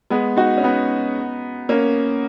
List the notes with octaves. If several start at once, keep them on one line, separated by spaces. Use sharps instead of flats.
G#3 B3
D#4 F#4
C#4
B3 D#4
A#3 C#4